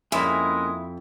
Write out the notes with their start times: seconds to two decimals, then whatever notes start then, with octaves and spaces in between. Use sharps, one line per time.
0.12 F2 G#3 A#3 C#4 E4 G#4